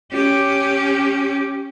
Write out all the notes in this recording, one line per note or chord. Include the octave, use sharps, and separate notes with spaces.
C#4 G4